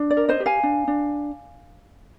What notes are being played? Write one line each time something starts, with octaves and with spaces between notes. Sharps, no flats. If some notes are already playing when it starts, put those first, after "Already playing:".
Already playing: D4
D5
A#4
C5 D#5
G4
F5 G#5
D4
D4